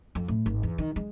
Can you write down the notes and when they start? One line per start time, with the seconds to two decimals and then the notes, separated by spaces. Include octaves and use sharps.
0.15 F2
0.28 A2
0.46 G#1
0.63 E2
0.78 D#3
0.96 G#3